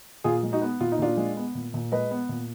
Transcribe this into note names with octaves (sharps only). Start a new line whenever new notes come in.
A#2 F4 G#4
G#3
D#4 F#4
B3
A#2 F4
D#4
A#2 D4 F4
G#3
B3
A#2
A#2
G#3 B4 D#5
B3
A#2